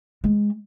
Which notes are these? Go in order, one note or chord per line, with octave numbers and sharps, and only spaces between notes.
G#3